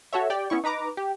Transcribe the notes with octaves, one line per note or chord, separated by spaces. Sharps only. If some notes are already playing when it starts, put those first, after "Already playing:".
F#4 A4 C#5 E5
G4 D5 G5
B3 C#4 E4 C#6
D#4 B4 A#5 D6
G4